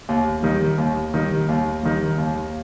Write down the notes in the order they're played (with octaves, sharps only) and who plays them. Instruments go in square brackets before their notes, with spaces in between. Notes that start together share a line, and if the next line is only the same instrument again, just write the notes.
[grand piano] D#2
D#3 G3
D#2
D#3 G3
D#2
D#3 G3
D#2